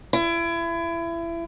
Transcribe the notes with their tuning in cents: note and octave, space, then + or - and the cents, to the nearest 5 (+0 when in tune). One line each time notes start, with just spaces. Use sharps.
E4 +30